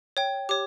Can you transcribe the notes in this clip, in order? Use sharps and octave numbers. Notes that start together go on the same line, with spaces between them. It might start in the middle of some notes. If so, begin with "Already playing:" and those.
C#5 G5
G4 C#5 D6